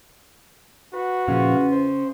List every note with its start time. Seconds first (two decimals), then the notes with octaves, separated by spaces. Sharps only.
0.93 F#4 B4
1.28 E2 A#2 C#3 F3 C#4 F4 F5
1.72 C5